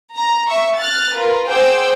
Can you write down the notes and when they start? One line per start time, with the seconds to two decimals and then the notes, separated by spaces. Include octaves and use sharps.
0.15 A#5
0.49 E5 C#6
0.79 F6 F#6 A6
1.14 F4 A#4 B4
1.49 G#4 C5 F#5 G5 D6 E6